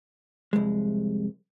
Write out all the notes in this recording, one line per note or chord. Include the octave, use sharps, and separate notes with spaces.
C2 F2 G#3